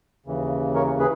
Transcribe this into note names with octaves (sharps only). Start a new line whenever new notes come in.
D#2 C#3 E3
A#4 C#5
G#4 B4